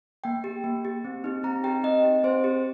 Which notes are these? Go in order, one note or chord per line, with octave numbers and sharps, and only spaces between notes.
A#3 G5
G4
A#3
G4
C4
D#4 G4
C4 A#5
D#4 G4 G5
C4 D#5
G4
C4 C5
G4